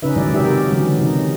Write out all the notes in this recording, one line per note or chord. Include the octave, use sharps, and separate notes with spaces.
C#3 C#4 D#4 B4 E5
D#3 F#3 G#3 E4 D5
C3 D#4 F#4 G4 D5 E5
A#4
D3 E3 F#3 G#3 C#4
C3 D#4